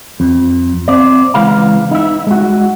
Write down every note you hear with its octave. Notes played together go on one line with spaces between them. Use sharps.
F2
C4 D5
C#2 E3 G#3 F5 A#5
D#4 E5
G#3 F#4